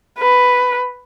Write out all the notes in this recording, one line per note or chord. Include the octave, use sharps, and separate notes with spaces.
B4